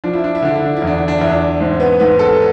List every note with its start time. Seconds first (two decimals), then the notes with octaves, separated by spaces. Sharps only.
0.04 F3 D4
0.13 E4
0.24 D4
0.35 E4
0.42 D3 D4
0.55 E4
0.66 D4
0.77 E4
0.82 E2
0.87 D4
0.98 E4
1.08 D4
1.18 E2 E4
1.29 D4
1.60 G#2 C4
1.80 B3
2.00 G#2 B3
2.19 A4